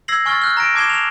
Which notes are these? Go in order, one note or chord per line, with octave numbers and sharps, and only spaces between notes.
E6 G#6 A#6 C7 F#7
G#5 C#6 F6 A6 G7
F6 F#6
A#5 A#6 D7
A5 D6 G#6 C7 E7 G7
E7 F7